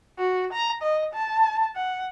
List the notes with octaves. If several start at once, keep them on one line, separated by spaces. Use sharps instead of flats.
F#4
A#5
D#5
A5
F#5